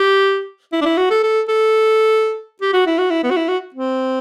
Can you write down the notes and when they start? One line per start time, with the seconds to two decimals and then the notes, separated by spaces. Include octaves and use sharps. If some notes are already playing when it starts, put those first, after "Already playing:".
Already playing: G4
0.72 E4
0.81 D4
0.86 E4
0.97 F#4
1.11 A4
1.23 A4
1.48 A4
2.61 G4
2.73 F#4
2.86 E4
2.98 F#4
3.10 E4
3.23 B3
3.30 F#4
3.36 E4
3.48 F#4
3.74 C4